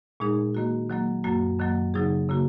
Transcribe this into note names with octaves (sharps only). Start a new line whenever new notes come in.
A#2 G#3 D#4 G#4
D#3 A#3 F#4
D#3 F#3 A#3
F#2 F#3 A#3 F#4
F#2 D#3 F#3 A#3
C#3 F#3 D#4 G#4
C#3 A#3 F#4